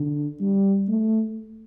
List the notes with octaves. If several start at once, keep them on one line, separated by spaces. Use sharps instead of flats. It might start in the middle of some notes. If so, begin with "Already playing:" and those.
Already playing: D3
G3
A3